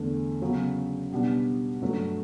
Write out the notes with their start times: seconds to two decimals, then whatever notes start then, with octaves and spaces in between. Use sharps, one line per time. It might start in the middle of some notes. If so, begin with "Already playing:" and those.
Already playing: E2 D3 A3 D4 A4
0.41 C#3 F#3 B3
1.12 B2 G3 B3 D4
1.81 G2 F#3 A3